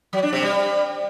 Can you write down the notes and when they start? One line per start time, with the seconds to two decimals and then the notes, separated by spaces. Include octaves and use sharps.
0.13 F#3
0.23 D4
0.33 C3
0.43 G3